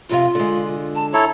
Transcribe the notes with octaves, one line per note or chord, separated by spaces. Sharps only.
F2 C3 F4 F5
D3 G#3
A5
E4 A4 C#5 A#5